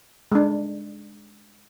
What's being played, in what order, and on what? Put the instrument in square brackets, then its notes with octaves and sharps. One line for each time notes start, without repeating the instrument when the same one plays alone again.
[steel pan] G#3 D4